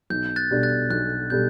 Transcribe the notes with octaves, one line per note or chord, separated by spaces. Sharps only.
B1 G6
F#6 A6
B2 G3 D4 A4
F#6 A6
B1 F#6
B2 G3 D4 A4 G6